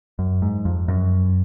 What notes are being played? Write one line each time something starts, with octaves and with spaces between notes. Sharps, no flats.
F#2
G#2
F2
F#2